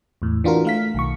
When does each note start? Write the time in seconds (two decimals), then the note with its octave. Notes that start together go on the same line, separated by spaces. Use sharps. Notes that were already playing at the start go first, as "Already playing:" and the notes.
0.22 E2 A2
0.44 E3 D4 F4 F#4 A#4
0.65 A3 F5 B6
0.95 B1 D#3 C#6